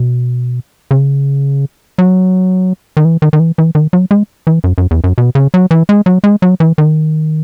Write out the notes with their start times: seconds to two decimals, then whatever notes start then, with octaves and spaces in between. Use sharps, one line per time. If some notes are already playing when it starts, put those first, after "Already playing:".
Already playing: B2
0.91 C#3
1.98 F#3
2.97 D#3
3.05 E3
3.22 D#3
3.33 D#3
3.39 E3
3.58 E3
3.75 D#3
3.93 F#3
4.11 G#3
4.47 E3
4.64 F#2
4.78 F#2
4.91 E2
5.04 F#2
5.18 B2
5.35 C#3
5.54 F#3
5.71 E3
5.89 G#3
6.06 F#3
6.24 G#3
6.42 F#3
6.60 E3
6.78 D#3